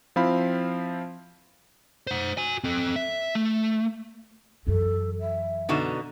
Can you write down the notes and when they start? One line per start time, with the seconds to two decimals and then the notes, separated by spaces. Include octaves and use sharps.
0.16 F3 C4 E4 F5 B5
2.07 C5 F#5
2.37 F#4 G#5
2.64 C4 A4
2.96 E5
3.35 A3
4.67 F#2 E3 A4
5.20 E5
5.69 B2 D3 D#4